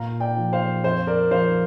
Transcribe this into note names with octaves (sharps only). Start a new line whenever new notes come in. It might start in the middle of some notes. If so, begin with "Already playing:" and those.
Already playing: A#2 F5 A#5
D5 G5
F3
C5 F5
F2 C5
A#4 D5
F3 C5 F5